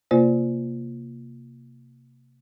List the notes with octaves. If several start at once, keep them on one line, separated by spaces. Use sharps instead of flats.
C3 A#3 F4 C5 D5